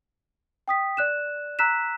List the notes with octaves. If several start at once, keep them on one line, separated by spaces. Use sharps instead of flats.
G5 D#6 B6
D5 F#6 E7
A#5 E6 F#6 B6 E7